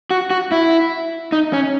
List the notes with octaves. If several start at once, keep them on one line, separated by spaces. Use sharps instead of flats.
F#4
F#4
E4
D#4
C#4